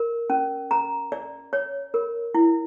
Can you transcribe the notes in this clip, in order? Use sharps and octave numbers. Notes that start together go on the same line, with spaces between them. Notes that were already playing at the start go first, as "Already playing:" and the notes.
Already playing: A#4
C#4
A#5
D5
C#5
A#4
E4